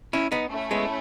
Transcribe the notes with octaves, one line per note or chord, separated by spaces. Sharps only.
C#4 E4
B3 D#4
A3 C#4 E4
G#3 B3